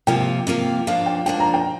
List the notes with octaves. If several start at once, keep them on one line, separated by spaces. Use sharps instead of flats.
C3 F3 A#3 F4 G5
C3 F3 A#3 F4
F3 A#3 D4 F5
G5
F3 A#3 D4 G5
A#5
G5